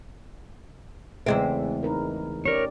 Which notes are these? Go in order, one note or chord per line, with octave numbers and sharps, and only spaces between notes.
E2 C#3 G#3 A3 C4 E5
D#4 A#4 B4
C#4 G4 A#4 C#5 D5